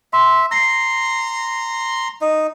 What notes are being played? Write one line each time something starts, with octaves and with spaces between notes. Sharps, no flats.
E5 C6
A#5 C6 A#6 C7
D#4